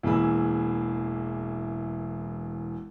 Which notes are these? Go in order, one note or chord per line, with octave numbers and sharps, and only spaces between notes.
E1 E3 A#3 G#4 B5 E6